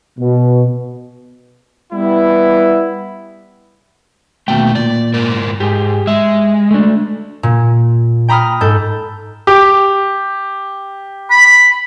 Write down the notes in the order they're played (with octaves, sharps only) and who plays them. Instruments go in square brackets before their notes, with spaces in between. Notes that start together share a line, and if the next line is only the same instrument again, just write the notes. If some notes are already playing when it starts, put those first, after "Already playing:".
[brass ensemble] B2
G3 B3 E4
[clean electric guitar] D#2 B2 G5 [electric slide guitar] A3
[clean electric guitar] A#2 [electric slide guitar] D5
[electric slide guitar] G#2 A#4 D5
[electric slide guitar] G#2 [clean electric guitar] G4 G#4
[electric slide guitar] G#3 [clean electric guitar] E5
[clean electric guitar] A3 D4
[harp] A#2
G5 A#5 B5 D#6 F6
G#2 A4 G6
[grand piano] G4
[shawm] B5